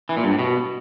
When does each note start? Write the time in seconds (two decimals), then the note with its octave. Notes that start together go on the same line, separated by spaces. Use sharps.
0.09 E3
0.17 A#2
0.24 G2
0.31 A2
0.39 B2